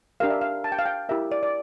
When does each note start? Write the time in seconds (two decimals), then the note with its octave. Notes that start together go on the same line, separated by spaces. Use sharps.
0.20 D4 G4 A#4 F5
0.30 E5
0.41 F5
0.64 A5
0.72 G5
0.79 F5
0.86 G5
1.09 E4 G4 A#4 E5
1.32 D5
1.43 D5